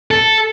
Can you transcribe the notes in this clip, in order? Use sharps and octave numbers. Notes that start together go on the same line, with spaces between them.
A4